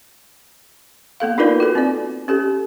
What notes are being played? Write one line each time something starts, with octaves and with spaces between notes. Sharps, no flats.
A#3 B3 A4 F5
D4 D#4 F4 A#4 B4 D5
F#4 A4
C4 D5
C#4 G4 A4